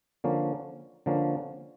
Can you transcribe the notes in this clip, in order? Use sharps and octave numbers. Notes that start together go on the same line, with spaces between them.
D3 F3 A#3 C#4
D3 F3 A#3 C#4